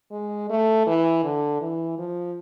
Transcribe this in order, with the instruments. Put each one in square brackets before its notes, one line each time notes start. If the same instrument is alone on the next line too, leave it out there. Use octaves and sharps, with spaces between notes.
[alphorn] G#3
A3
E3
D3
E3
F3